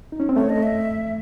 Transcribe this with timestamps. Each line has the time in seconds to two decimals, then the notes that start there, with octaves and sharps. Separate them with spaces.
0.12 D#4
0.20 C#4
0.29 C4
0.36 A3 C#5
0.50 D#5
0.63 E5